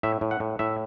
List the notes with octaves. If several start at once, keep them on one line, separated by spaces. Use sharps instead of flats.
A2 E5
A2
F#5
A2
A2 E5